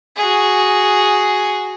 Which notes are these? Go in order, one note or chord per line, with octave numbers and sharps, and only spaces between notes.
F#4 G#4